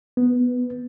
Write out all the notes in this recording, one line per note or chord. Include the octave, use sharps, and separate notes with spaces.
B3